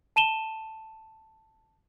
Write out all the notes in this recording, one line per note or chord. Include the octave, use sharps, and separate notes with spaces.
A5 D#7 E7 G7